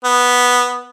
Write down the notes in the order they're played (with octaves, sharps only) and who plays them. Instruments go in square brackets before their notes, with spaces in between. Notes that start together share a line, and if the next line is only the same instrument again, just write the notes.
[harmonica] B3